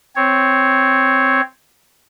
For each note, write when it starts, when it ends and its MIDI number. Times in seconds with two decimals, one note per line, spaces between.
0.16 1.41 60
0.16 1.41 73